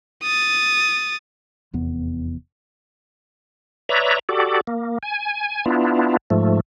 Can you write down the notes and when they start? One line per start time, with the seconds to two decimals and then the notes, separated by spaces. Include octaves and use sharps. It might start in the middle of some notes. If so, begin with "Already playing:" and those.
0.24 D#6 A6
1.73 F1 E2 B3
3.89 B4 C#5 D5 E5 A#5
4.29 F#4 G4 A4 D5
4.67 A#3
5.03 G#5
5.66 B3 D4 E4 F4
6.30 G#2 F3 A3